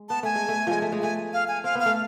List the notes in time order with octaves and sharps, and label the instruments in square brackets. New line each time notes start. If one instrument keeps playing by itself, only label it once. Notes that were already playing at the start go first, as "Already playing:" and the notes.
Already playing: [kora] G#3
[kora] B3 [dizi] A5
[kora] A3 [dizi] G#5
[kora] G#3
A3
F3 G#3
A3
G#3
[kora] A3 [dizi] G#5
[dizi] F5
G#5
[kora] C4 [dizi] F5
[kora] B3 [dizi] F5
[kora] A3